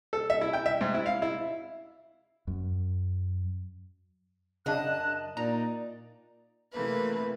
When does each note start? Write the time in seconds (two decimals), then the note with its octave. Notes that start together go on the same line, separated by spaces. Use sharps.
0.13 A4
0.30 E5
0.41 E4
0.53 G5
0.66 E5
0.81 G#2
0.94 E4
1.06 F5
1.22 E4
2.47 F#2
4.66 F#2 C#3 D4 D#5 A5 F#6
5.37 A#2 D#4 D5 A#5
6.72 C3 E3 A3 A#3 B4